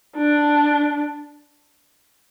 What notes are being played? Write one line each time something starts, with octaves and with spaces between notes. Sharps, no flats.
D4